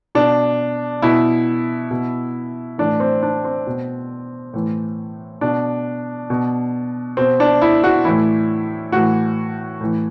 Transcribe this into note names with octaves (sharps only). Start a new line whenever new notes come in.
B2 D4
B2 E4
B2
A2 E3 D4
C4
D4
C4
B2
A2 E3
B2 D4
B2
B2 C4
D4
E4
F#4
A2 E3 E4
A2 E3 F#4
A2 E3